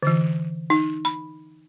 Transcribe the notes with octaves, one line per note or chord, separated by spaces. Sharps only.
D3 E3
D#4
B5